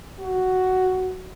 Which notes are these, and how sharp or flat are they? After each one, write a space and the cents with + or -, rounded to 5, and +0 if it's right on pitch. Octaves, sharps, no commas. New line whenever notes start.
F#4 +5